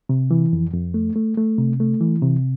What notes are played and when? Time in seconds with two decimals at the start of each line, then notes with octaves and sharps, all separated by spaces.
0.09 C3
0.31 E3
0.53 F2
0.74 F2
0.94 A3
1.16 A3
1.37 A3
1.58 C3
1.80 A3
2.01 E3
2.22 C3